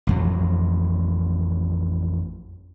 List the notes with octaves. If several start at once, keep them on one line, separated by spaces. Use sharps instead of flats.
A1 F2 F#3